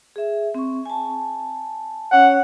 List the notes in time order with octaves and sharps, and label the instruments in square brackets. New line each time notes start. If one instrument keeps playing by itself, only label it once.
[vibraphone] G#4 E5
C4 C#6
G#5 A5
[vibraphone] C#4 C#5 [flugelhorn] F#5